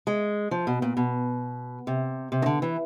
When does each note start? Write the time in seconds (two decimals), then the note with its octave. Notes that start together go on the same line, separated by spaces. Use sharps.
0.07 G#3
0.51 F3
0.67 B2
0.82 A#2
0.97 B2
1.87 C3
2.32 C3
2.42 D#3
2.46 D3
2.62 E3